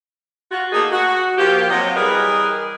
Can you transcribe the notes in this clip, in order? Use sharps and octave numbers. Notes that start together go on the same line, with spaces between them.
F4 F#4
A3 A#3 D#4 G#4
F#4
F3 A#3 G4
C3 F#3 D#5
E3 G3 G#4 A#4 B4 D#5